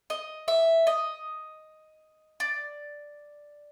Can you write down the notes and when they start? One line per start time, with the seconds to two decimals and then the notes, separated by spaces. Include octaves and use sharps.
0.10 D#5
0.48 E5
0.87 D#5
2.40 D5